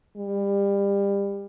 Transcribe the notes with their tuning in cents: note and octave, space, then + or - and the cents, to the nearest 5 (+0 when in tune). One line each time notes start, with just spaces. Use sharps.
G3 +25